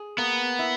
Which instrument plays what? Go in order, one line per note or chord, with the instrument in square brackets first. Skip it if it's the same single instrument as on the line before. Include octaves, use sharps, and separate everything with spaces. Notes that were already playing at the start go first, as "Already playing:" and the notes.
Already playing: [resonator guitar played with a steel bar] G#4
[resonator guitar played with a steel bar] A#3 [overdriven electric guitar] B3
[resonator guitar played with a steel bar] E4